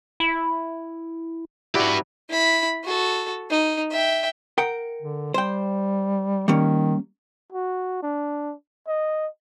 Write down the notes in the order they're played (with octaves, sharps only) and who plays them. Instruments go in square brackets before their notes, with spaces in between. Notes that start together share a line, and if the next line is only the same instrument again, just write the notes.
[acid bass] E4
[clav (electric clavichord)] E4 F#4 D5 [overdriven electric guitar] G4 B4
[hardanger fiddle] E4 B5
F#4 A4
D#4
E5 G5
[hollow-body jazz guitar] A#4 F#5 G5
[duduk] D3
[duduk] G3 [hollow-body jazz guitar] C5 G5
[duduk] D#3 [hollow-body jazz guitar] G3 A#3 C#4
[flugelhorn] F#4
D4
D#5